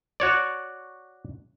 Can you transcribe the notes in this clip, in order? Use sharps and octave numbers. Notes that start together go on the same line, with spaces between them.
F#4 C#5 D5